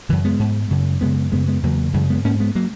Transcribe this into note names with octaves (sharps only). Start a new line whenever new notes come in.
F#2 C#3 E3
G#3 B3
G#2
F#2 C#3
F#2 C#3 G#3 B3
F#2 C#3 G#3 B3
G#3 B3
E2 C#3 F#3 A#3
F#2 C#3 E3 G#3
G#3 B3
G#2 A#3 C#4
G#3 B3
F#3 A#3